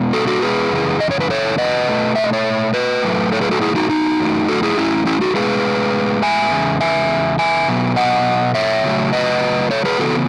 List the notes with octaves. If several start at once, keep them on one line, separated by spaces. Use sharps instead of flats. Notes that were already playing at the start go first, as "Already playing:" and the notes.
Already playing: B2 G#3 B3
F#4 A4
F#4 A4
G#4 B4
F#2 C#3 E3 G#3
D#5
C#5
B4
A4 C#5
B4 D#5
B2 A3
E5
D#5
C#5 E5
B4 D#5
A2 F#3 A3
A4 C#5
G#4 B4
F#4 A4
E4 G#4
D#4 F#4
D#4 F#4
F#2 E3 A3
F#4 A4
E4 G#4
C#4 E4
C#4 E4
D#4 F#4
A2 G#3 B3 G#4 B4
E5 G#5
E2 C#3 G#3
E5 G#5
E5 G#5
B2 F#3 B3
D#5 F#5
C#5 E5
C#3 F#3 A3
B4 D#5
A4 C#5
G#4 B4
C#3 E3 B3 F#4 A4